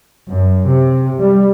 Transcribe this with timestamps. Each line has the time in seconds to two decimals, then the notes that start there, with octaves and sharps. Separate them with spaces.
0.27 F#2
0.66 C3
1.20 G3